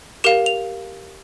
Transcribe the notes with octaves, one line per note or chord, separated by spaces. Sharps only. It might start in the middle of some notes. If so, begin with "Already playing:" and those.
G4 A#4 F5 E7
F7